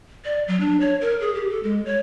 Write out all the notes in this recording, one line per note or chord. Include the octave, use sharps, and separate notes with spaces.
D5
F#3
D4
C#5
A#4
G#4
G4
A4
G#3
C#5